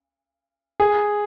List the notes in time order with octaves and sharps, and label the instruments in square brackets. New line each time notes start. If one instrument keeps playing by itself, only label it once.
[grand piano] G#4